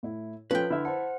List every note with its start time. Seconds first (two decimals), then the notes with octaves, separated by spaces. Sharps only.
0.03 A2 E4
0.51 F3 C#4 F4 A4 B4 G5
0.70 D3 E4 E5 F6
0.85 C5 F#5 A5